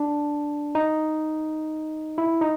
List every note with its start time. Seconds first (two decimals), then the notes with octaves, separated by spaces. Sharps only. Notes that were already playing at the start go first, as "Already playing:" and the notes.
Already playing: D4
0.75 D#4
2.18 E4
2.41 D#4